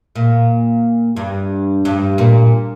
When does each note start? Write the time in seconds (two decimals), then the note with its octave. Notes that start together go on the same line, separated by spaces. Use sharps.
0.16 A#2
1.16 G2
1.85 G2
2.18 A#2